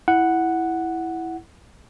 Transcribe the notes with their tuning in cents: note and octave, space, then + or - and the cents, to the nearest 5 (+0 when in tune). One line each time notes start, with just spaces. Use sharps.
E4 +0 F#5 +0